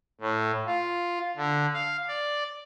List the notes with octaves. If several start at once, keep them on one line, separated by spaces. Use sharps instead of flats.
A2
F4
D3
F5
D5